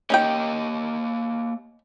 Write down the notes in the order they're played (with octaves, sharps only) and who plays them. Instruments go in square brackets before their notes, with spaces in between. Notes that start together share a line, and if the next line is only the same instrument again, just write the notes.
[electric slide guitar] A#3 G4 D#5 [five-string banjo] C#4 D#4 G5